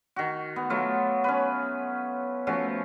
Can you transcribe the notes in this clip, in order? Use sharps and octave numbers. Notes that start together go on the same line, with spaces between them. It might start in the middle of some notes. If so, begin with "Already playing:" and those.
D#3 F#4
B3
F#3 A3 F4
C#4 B4
F3 A3 C#4 F#4